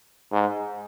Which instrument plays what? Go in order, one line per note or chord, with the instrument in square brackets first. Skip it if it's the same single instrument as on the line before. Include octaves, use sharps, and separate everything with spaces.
[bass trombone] G#2